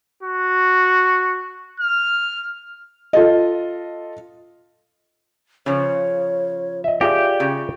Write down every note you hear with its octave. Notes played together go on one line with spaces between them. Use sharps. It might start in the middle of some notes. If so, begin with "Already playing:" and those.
F#4
F6
F4 A4 D#5
C#3 F3 C#5
D#5 E5
F4 G4 G#4 D5 E5
C#3